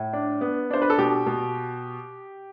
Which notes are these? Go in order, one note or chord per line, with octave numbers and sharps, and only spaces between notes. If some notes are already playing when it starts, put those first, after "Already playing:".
Already playing: A2
D4
B3
D4 C5
B4
A4
B2 G4
B2